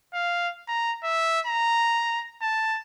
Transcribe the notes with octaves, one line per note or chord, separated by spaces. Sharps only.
F5
A#5
E5
A#5
A5